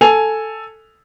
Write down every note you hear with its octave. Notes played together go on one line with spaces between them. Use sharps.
A4 G#5 F7